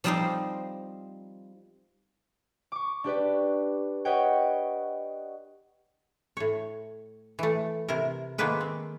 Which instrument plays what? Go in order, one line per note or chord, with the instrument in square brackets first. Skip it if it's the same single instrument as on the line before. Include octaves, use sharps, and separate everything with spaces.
[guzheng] F3 G3 C4 D#4 F4 C5
[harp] C#6 D6
D4 G4 B4 D5
B4 C#5 D#5 F#5 G5
[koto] A2 C#5
E3 A3
C3 E4 A#4
D#3 G#3 A#3 B3 B4 G5
C4